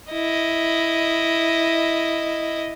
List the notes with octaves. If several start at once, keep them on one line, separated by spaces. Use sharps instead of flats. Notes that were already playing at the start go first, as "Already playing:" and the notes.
E4 D#5